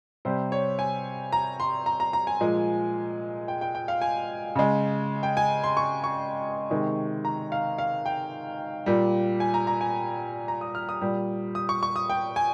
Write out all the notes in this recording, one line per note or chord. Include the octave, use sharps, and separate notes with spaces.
C3 G3 C5
C#5
G#5
A#5
C6
A#5
A#5
A#5
G#5
A#2 F3 G#3
G5
G5
G5
F5
G#5
C#3 G#3
G5
G#5
C6
C#6
C#6
C3 D#3 G#3
A#5
F5
F5
G5
A#2 G3
G#5
A#5
A#5
G#5
A#5
D#6
F6
D#6
A#2 G3
D#6
C#6
C#6
D#6
G5
G#5